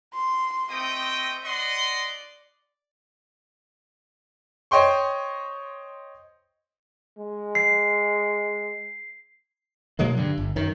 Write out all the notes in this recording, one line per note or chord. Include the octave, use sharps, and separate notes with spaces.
C6
A3 C4 D#5 G5 D#6
D5 D#5 F#5 C6
C5 C#5 D#5 G5 C6 C#6
G#3
C7
B2 F#3 G#3 A#3
G2 D3
G1
F#2 D#3